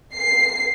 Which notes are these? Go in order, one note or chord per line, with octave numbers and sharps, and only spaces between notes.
C7